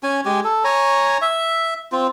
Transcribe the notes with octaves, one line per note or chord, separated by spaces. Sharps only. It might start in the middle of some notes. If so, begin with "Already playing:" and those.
C#4 G#5
G#3 G4 G#5
A4
C#5 G#5 A#5
E5
C4 F4